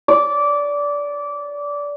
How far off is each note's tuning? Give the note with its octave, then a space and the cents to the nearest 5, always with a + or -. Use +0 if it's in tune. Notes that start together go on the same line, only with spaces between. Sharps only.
D5 -20